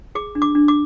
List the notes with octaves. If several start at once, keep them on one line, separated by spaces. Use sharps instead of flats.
G#4 D6
D4
D6
D4
D6